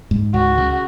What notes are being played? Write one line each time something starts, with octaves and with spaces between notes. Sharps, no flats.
G#2
C#2 F#4
C#3